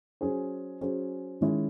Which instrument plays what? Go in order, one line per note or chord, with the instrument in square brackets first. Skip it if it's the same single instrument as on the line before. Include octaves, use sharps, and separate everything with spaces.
[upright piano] F#3 C#4 G#4 C5
F#3 C#4 G#4 C5
D#3 G#3 C#4 E4